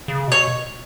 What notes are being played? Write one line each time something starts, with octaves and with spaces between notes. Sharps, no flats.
C#3
B2 C#5